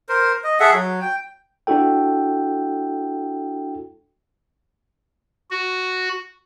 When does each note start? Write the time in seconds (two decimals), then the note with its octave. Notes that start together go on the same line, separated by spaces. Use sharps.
0.09 A#4 C5
0.44 D#5
0.60 G#4 A4 E5 F#5
0.73 F#3
1.02 G5
1.67 D4 E4 F#4 A4 G5
5.51 F#4